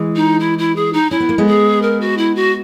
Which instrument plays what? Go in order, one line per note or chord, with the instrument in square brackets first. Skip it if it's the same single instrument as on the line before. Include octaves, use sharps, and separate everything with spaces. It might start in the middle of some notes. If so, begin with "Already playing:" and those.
Already playing: [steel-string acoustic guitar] E3 G#3
[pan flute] D#4
E4
E4
G#4
D#4
[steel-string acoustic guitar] C#4 [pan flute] E4
[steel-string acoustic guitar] B3
A#3
G#3 B3
[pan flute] G#4
A#4
F#4
E4
F#4